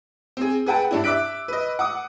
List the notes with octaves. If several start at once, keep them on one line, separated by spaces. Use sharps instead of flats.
C4 G#4
G#4 B4 F#5 G5 A5
G2 D4 E4
E5 D6 E6 F#6 B6 D7
B4 D#5
F#5 D6 D#6